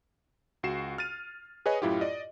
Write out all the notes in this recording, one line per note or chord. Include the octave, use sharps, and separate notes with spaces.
C#2 F#4 C7 E7
F6 A6 D#7
G#4 B4 C#5 D#5 G#5
F#2 A2 E4 F4 G4
D5 D#5